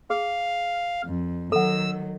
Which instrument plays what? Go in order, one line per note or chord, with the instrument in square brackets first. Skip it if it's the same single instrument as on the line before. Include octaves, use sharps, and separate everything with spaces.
[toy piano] G#4 [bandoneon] F5
[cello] F2
[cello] D#3 F#3 [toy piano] A4 F#5 [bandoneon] E6